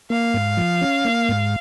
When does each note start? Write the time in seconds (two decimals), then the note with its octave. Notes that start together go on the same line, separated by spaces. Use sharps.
0.10 A#3 F5
0.34 G#2
0.57 F3
0.81 C#4
1.05 A#3
1.29 G#2